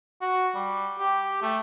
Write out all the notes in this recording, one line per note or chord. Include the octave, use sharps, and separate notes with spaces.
F#4
G3
G4
A3